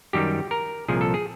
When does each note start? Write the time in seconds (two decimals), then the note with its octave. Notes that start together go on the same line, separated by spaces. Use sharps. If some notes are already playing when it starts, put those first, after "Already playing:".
0.13 F#2 D#3 G3 G4
0.51 A#4
0.88 C2 A#2 F3 G#4
1.01 A4
1.14 G#4